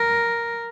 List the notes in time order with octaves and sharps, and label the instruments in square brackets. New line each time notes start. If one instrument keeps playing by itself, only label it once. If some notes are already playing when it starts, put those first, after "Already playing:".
Already playing: [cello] A#4